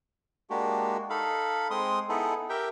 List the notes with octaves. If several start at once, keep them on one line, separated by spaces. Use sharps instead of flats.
G#3 A#3 D4 F#4 G4
D#4 A4 F5 B5
G#3 C4 C6 D#6
B3 D#4 E4 G#4 A4
G4 A#4 E5 G5